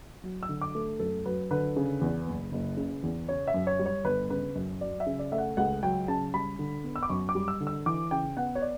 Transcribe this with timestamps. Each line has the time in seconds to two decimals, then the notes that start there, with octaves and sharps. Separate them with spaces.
0.24 F#3
0.43 E6
0.49 D3
0.61 D6
0.75 A3
0.99 F#2 A4
1.25 F#3 B4
1.51 D3 B4
1.76 C#3
2.01 E2
2.27 F#1
2.52 F#1
2.77 C#3
3.03 E2
3.29 C#3 C#5
3.48 E5
3.54 F#2
3.67 C#5
3.79 G3
3.86 C#5
4.05 G1 B4
4.30 C#3 B4
4.55 F#2
4.81 F#3 D5
5.00 E5
5.06 C#3
5.19 D5
5.32 A3 E5
5.38 F#5
5.57 C#2 F#5
5.83 F#3 G5
6.08 C#3 A5
6.34 G3 B5
6.59 D3
6.84 B3
6.96 E6
7.03 D6
7.10 F#2 C#6
7.29 D6
7.35 G3
7.48 E6
7.60 D3
7.67 E6
7.86 E3 D6
8.11 C#3 G5
8.37 B3 F#5
8.55 C#5
8.62 D5